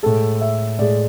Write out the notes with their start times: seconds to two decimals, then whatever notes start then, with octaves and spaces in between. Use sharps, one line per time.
0.03 A2 G#3 A4
0.41 E5
0.79 A2 G#3 D5